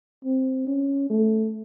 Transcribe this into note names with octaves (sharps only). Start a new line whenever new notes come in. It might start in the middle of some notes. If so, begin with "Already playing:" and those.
C4
C#4
A3